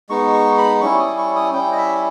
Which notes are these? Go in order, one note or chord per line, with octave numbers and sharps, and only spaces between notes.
G#3 B3 D#4 C#6
C#6
B5
G3 C#4 E4 C#6
D#6
C#6
D#6
G3 C#4 E4 G5
D#5
E5